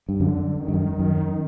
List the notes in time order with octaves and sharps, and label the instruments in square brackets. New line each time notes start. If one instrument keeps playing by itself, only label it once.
[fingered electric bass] G2
[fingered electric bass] F#2 [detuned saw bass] D3
[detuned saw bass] D#3
[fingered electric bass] G2
F#2
[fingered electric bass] F#2 [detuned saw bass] D#3